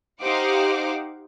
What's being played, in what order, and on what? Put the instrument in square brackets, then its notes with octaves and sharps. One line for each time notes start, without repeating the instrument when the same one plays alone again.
[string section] D#4 G4 C5 F5 F#5 D6